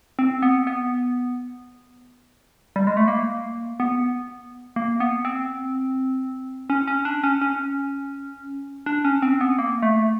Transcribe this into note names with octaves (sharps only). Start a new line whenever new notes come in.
C4
B3
B3
G3
G#3
A3
A#3
B3
A#3
B3
C4
C#4
C#4
D4
C#4
C#4
D4
C#4
C4
B3
A#3
A3